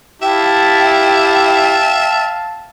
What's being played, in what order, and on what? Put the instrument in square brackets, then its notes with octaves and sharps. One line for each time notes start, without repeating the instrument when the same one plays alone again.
[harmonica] E4 G4 [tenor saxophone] E5 [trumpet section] F5 A5 [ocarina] G5